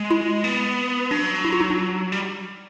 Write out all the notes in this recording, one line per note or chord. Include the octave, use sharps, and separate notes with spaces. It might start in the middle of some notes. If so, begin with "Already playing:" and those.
Already playing: G#3
E4
B3
F#3 D4
E4
F4
D#4
D4
G3